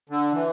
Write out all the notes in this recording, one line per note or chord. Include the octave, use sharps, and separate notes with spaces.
D3
E3